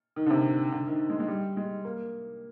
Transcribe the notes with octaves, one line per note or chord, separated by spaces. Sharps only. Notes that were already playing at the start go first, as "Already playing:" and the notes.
D#3
D3
C3
D3
D#3
G#3
G#3
G3
G#3
A#3